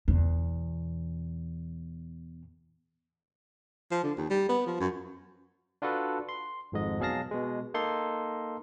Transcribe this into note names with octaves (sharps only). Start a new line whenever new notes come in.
E2 B2
F3
D3
D#2
G3
B3
F3
F#2
D4 F4 F#4 A4 B4
C6
G#1 F2 G#2 D#5
B2 F#3 G#4 F5 A5 A#6
B2 G#3
A#3 D#4 A4 C6